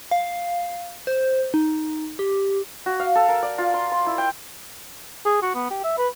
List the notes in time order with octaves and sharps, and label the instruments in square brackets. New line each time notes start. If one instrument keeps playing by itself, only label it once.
[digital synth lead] F5
C5
D#4
G4
[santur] F#4
F5
A4
A#4
D5
F4
C6
C6
E4
G5
[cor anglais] G#4
F#4
B3
G4
E5
B4